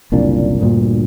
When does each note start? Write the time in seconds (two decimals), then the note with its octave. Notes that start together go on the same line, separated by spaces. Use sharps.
0.12 F#1 C2 A#2 D4
0.61 D2 G2 A#2